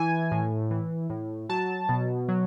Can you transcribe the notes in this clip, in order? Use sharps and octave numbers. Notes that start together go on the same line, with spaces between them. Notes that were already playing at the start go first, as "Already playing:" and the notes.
Already playing: E3 G#5
A2
E3
A2
F#3 A5
B2
F#3